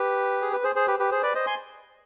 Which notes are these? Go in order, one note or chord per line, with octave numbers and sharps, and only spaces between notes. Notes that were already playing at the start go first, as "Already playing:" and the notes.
Already playing: G4 B4
G#4
B4
G#4 C5
G#4 C5
G4 B4
G4 B4
G#4 C5
B4 D5
C5 D#5
G#5 C6